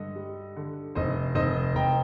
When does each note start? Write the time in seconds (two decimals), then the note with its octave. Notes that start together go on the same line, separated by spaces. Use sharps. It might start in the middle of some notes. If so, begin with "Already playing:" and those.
Already playing: G2 D3 D#5
0.16 G3
0.56 D3
0.95 F1 C5 D#5
1.35 F1 C5 D#5
1.75 F1 G5 A#5